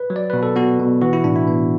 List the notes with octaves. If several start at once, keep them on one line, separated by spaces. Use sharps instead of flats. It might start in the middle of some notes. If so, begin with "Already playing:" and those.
Already playing: B4
F#3
D5
B2 B4
A4
B3 F#4
B2
E3 F#4
E4
A2 D4
E4
B3